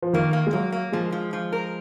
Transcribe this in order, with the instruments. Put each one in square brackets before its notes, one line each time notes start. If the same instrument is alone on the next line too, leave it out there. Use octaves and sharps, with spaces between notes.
[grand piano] F3
[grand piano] D#3 [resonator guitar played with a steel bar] A#3
[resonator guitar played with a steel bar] A#3
[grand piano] G#3
[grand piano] F#3 [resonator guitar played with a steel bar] A#3
[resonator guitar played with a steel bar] A#3
[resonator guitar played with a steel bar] F3 [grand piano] G#3
[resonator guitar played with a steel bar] F3
F3
A#4